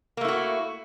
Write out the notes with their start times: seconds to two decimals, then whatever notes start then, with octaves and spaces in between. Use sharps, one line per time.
0.17 A#3
0.21 A3
0.25 E4
0.28 F#4